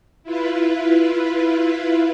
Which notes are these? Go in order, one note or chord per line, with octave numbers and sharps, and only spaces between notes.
E4 F4 B4